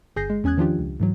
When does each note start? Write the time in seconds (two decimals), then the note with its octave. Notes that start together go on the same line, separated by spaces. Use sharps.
0.16 G1 G#4 G#5 G6 A#6 C7
0.30 G#3
0.44 E2 C#4 G#5 D#6 F#6 G#6
0.57 D#3 F3 D4 F4 G4
0.79 C#2
1.00 G#2 E3 F#3